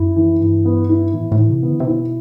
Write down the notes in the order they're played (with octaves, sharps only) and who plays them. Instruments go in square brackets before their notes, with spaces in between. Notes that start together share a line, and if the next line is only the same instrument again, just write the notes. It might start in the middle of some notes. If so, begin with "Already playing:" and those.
Already playing: [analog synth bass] F#2 [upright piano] E4
[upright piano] E3
[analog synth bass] G2 [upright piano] E3
[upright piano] B3
E4
[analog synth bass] A2 [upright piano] E3
[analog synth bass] A2
[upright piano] E3
[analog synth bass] C3
[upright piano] B3
[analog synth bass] D3
C3
[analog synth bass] B2 [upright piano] E4